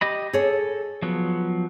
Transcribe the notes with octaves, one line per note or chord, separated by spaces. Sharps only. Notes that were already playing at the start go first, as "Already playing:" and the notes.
G4 D#5 B5
G#4 A4 C#5
F3 F#3 B3